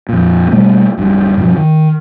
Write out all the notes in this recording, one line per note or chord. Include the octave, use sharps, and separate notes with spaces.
F2 A#2
B2 G3 A3 A#3
D1 G2
G2 B2 F3 F#3
D#3